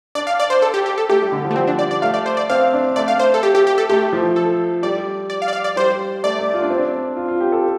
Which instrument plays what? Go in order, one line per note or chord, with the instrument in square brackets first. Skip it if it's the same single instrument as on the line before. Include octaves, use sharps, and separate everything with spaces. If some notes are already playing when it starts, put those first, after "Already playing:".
[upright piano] D4 [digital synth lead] D5
[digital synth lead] F5
D5
C5
A4
G4
G4
A4
[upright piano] A3 [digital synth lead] G4
[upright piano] G3
D3
F3
[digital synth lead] A3
[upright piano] G3 [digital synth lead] C4
[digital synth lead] D4
D5
D5
[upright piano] A3 [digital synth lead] F5
[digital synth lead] D5
C5
D5
[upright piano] C4 [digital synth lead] F5
[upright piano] D4
[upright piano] A3 [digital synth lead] D5
[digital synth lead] F5
C5
A4
G4
G4
G4
A4
[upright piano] A3 [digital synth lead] G4
[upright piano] F3
[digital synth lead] A4
[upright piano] G3 [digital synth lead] D5
[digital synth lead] D5
F5
D5
F5
D5
[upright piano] G3 [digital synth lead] C5
[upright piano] A3 [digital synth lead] D5
[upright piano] A3
F4
D4
C4
D4
F4
F4
G4
A4